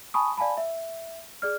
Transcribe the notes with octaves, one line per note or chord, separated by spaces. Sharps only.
G#5 A5 B5 C#6 D#6
D5 F5 G#5 A5 B5
E5
G#4 D5 F6